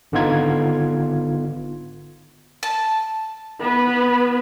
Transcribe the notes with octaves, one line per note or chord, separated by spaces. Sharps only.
G#1 D3 B3 D#4 F4 G#6
A5
B3 B4